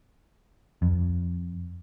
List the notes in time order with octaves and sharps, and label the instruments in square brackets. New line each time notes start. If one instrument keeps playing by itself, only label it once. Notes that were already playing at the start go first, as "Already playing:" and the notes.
[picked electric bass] F2